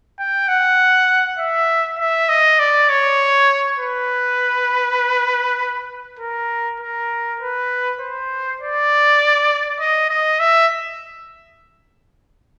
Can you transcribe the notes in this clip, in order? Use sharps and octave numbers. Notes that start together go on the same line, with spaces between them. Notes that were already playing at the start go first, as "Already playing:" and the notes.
G5
F#5
E5
E5
D#5
D5
C#5
B4
A#4
A#4
B4
C5
D5
D#5
D#5
E5